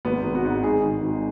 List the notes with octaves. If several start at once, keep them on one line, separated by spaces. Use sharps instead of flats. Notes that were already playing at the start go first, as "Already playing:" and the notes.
G#1 B3
G#1
F#4
G#2
G#2 G#4
D#3
G#1